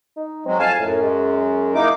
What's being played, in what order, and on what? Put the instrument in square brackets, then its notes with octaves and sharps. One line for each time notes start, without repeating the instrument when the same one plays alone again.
[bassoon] D#4
[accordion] F#3 G#3 [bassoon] C4
[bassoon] F2 [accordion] F5 G#5 A5
[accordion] F#2 [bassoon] A2
[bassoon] G#3
[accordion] A#3 D#4 D6 [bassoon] E4